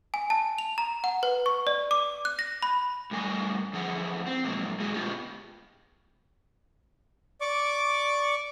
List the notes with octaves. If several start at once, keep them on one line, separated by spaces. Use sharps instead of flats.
G#5
A5
F7
A#5
F#5
B4
C#6
D5
D6
F#6
A#6
B5
A2 G3 A#4 G#5
E2 F3 G#4 F#5
C4
A#2 F3 F#3 G#3 A#3
G#3 F#4 G#4
B2 B3 F4 G4
D5 C#6 D6